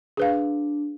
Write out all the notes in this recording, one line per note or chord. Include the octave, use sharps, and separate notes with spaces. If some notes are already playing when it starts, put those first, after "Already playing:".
D4 G#4 B4 F5